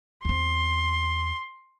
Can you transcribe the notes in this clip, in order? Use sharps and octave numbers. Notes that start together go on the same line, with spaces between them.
E2 C4 C6